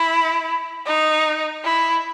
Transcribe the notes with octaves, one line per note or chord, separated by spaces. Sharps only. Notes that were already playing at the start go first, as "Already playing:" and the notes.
Already playing: E4
D#4
E4